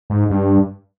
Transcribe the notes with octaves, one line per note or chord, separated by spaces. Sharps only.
G#2
G2